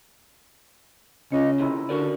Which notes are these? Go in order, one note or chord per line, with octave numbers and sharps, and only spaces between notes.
C#3 C#4 F4 D#5
C3 D#3 E4
D3 F#4 A#4 D5